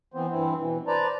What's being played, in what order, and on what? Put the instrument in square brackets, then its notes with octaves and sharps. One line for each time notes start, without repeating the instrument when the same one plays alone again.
[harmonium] E3 B3 C4 C5
G2 E3 C4 E4
B2 E3
B4 C5 D5 A5 A#5